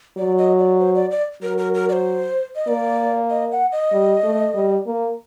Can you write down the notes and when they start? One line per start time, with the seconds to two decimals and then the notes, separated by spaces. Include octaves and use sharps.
0.17 F#3 D5
0.38 D#5
0.59 D5
0.79 C5
0.95 D5
1.11 D5
1.42 F#3 A#4
1.58 A#4
1.74 A#4
1.89 D5
1.93 C5
2.56 D#5
2.68 A#3 D5
3.30 D#5
3.52 F#5
3.72 D#5
3.93 G3
4.24 A3
4.55 G3
4.87 A#3